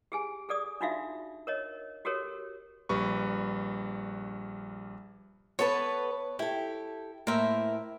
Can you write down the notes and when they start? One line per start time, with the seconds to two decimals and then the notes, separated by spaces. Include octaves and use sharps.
0.12 G4 G#4 G#5
0.49 G#4 A4 D5 D#6
0.81 D4 D#4 F4 F#4 E5 F5
1.47 A#4 C#5 D#5
2.05 F#4 G4 A4 A#4 C#5
2.89 A#1 G3 B4 C#6
5.59 B3 A4 B4 C#5 A5
6.39 E4 G4 A4
7.27 A2 A#3 A#4 C5 E5